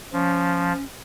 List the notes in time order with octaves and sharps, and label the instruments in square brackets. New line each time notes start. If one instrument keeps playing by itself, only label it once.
[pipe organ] F3 [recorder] C#4